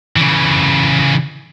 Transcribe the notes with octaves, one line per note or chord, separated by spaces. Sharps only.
C#3 E3